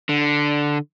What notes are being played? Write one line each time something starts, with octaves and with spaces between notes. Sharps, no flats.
D3